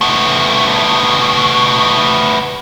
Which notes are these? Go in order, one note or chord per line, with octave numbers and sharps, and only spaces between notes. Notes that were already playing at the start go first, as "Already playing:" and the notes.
A3 B3